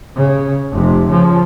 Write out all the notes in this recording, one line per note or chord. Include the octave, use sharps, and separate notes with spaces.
C#3
F1 C3
C#3 F3